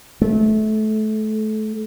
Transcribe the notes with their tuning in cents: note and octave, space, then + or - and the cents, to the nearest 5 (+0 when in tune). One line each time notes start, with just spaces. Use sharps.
A3 -25